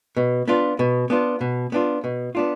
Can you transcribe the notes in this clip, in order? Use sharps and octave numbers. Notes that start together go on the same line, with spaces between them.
B2
B3 D4 F4
B2
B3 D4 F4
B2
B3 D4 F4
B2
B3 D4 F4